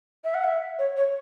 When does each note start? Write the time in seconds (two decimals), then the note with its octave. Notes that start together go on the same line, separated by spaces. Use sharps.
0.24 E5
0.34 F#5
0.43 E5
0.78 C#5
0.96 C#5